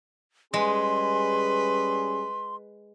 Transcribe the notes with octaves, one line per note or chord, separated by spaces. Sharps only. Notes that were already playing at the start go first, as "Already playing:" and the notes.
G3 G#3 C#4 G#4 B4 C6